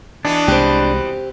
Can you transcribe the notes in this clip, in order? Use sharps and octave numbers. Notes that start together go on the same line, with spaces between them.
B2 E3 B3 D4
C2 G#3 C4 G4